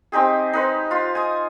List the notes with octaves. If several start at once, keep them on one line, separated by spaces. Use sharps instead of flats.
C4 D#4 G4 G#4
D#4 B4 C5
F4 C6
G#5 D#6